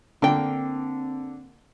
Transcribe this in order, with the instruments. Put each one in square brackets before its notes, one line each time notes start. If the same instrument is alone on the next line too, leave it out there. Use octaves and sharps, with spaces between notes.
[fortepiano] D3 [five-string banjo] A#3 G5 [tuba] C4